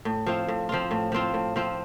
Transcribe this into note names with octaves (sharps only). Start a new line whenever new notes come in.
A2
F3 C4 F4
A2
F3 C4 F4
A2
F3 C4 F4
A2
F3 C4 F4